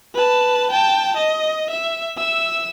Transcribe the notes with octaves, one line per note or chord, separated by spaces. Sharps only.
B4 A5
G5 A5
D#5
E5
E5 E6